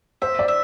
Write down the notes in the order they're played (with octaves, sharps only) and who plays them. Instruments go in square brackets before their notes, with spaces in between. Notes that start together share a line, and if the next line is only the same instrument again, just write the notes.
[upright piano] C5 [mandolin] E5
[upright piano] D5
[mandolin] E5